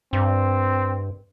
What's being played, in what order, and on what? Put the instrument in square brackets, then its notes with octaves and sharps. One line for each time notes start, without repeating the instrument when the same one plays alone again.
[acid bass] G2 [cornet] C4